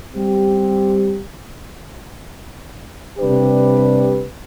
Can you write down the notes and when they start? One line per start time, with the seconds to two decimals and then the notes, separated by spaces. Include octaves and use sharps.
0.13 G3 C4 G4
3.18 C3 G3 D4 G4 B4